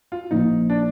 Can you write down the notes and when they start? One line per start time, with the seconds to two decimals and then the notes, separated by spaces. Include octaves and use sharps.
0.12 F4
0.31 A#1 A#2 F3 A#3 D#4
0.70 D4